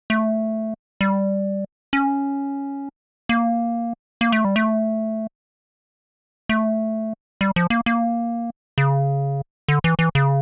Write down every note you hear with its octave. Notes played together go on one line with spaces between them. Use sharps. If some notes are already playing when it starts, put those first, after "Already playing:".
A3
G3
C#4
A#3
A#3
A3
G3
A3
A3
G3
F3
A#3
A#3
C#3
D3
E3
E3
C#3